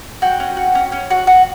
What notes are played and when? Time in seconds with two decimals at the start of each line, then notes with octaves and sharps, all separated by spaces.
0.22 F#4 G5
0.40 C#4
0.57 F#4
0.75 C#4
0.92 C#4
1.10 F#4
1.27 F#4